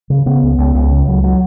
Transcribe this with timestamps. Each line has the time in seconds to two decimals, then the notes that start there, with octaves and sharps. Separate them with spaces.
0.10 C#3
0.26 C#3 B3
0.42 C#2
0.58 C#2
0.75 C#2
0.91 C#3
1.07 C#2 F#3
1.24 F#3